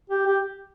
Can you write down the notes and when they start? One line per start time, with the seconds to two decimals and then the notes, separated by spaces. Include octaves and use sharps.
0.10 G4
0.26 G4